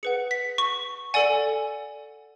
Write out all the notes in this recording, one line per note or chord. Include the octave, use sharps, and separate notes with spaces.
G#4 B4 F#5 C#7
B6
C#6
A4 D5 F#5 G#5